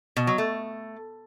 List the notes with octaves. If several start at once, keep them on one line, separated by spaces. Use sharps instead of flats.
B2
F#3
A3